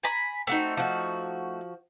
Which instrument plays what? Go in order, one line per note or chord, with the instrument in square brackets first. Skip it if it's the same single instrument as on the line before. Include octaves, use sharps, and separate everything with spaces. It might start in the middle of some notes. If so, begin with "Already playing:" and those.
[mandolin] G#5 A#5 B5
[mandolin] A3 D#4 [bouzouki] C4 F#4
[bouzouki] F3 F#4